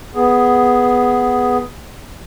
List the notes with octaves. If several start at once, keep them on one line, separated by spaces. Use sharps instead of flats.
B3 G#4